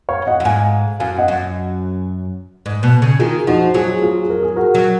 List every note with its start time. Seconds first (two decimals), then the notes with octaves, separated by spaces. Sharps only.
0.09 C#5 F5
0.27 D#5 F#5
0.40 F#2
0.45 G#2 F5 G#5
1.00 F#2 F5 G#5
1.18 D#5 F#5
1.28 F#2
2.66 G#2
2.83 B2
3.02 C#3
3.19 D#3 F4 G#4
3.47 F3 D#4 F#4
3.74 F#3 F4 G#4
4.02 F4 G#4
4.30 A#4
4.43 G#4
4.56 F#4 A#4
4.74 F#3